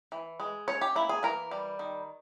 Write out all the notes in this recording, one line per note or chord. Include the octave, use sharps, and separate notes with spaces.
E3
G#3
C#4 C#5
G4
A#3 E4
G#4
E3 A#4
G3
D#3